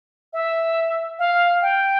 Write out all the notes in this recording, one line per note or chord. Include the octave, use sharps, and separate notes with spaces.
E5
F5
G5